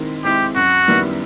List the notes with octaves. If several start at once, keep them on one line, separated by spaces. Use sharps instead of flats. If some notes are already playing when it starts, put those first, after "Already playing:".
Already playing: D#3 G#3 C4 E4
G#3 C4 E4 G4
F#2 F#4
D#3 G3 B3 E4